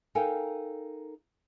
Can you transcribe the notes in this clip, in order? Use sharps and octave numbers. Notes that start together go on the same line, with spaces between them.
D#4 A4 A#4 F5 G5 G#5